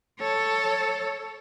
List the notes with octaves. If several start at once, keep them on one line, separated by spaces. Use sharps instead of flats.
A4 C#5